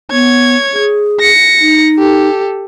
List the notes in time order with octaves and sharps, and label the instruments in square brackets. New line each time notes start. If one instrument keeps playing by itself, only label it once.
[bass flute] B3 [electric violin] C#5 G#6
[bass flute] G#4
[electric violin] A#6 C#7
[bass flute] D#4
[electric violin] G4 A4